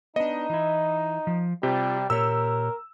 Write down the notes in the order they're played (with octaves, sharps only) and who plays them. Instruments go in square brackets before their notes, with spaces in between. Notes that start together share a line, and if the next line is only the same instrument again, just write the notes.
[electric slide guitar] B3 D4 [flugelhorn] D#4 [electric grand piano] D#5
[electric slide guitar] E3 E4
F3
[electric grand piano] C3 [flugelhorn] G3 [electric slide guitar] F4 G4
[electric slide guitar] A#2 G4 C#5 [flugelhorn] A#4 [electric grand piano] E6